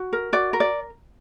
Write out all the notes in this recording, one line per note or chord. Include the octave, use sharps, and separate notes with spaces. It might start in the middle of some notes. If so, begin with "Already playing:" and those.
Already playing: F#4
A#4
F#4 D5
A#4
D5